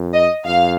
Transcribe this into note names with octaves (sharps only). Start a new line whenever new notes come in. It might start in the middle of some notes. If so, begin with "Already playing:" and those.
Already playing: F2
D#5
F2 F5